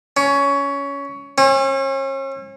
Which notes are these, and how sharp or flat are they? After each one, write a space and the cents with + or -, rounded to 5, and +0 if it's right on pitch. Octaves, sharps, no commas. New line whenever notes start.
C#4 +15
C#4 -40